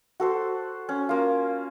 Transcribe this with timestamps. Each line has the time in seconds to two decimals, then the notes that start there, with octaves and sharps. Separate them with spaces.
0.20 F#4 A4 C5
0.89 C#4
1.09 A#3 F4